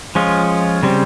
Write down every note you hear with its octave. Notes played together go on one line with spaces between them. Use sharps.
F3 G#3 C#4 F4
C#3 G3 C4